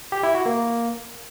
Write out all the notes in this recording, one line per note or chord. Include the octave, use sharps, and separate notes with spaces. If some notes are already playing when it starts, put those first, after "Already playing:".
G4
E4
F#4
A#3